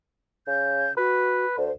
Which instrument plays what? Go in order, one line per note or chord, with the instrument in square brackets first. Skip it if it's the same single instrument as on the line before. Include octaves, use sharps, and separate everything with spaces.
[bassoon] C#3 [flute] G6
[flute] F#4 [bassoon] B4
[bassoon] D2 [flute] C5